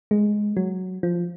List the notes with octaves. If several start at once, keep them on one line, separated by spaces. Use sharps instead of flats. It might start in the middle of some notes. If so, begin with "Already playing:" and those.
G#3
F#3
F3